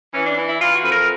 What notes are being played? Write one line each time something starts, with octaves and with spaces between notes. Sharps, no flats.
E3 C#4
D4
E3
E4
E3 F4
F#4
F2 B4
A#4